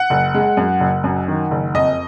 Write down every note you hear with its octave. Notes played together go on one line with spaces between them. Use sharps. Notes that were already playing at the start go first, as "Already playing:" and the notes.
Already playing: F#5
F#1
G#3
F#2
F#1
F#2
D#3
F#1
F2 D#5